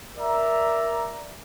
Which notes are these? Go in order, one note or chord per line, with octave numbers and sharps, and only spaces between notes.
A#4 D5 E5 A#5